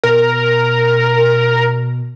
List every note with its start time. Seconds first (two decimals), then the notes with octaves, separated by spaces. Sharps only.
0.04 B2 A#4